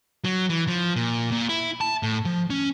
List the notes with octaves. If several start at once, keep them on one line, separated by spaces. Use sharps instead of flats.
F#3
E3
F3
A#2
A#2
E4
A5
A2
F3
C#4